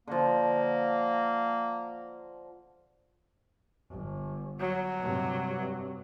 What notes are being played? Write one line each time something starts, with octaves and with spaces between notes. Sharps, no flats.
D3 F3 A#3
G1
F#3
G2 C3